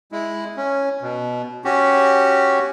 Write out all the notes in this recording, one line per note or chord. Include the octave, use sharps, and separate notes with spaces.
G#3 E4
C#4
B2
C#4 F#4 G4